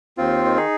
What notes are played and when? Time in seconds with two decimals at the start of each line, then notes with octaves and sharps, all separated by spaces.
0.18 D#2 C4 F4
0.44 D#3
0.56 D#4 G#4